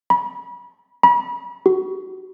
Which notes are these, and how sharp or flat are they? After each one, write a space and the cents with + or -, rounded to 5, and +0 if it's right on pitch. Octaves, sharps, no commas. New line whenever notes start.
B5 -30
B5 -35
F#4 +30